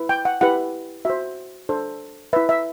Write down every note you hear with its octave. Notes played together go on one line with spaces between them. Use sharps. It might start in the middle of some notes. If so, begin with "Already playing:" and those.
Already playing: E4 B4
G5
F#5
E4 G4 B4 F#5
F#4 C5 E5
D4 A4 C5
E4 B4 E5
E5